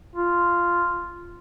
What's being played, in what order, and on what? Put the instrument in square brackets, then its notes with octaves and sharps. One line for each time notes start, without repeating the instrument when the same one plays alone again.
[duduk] F4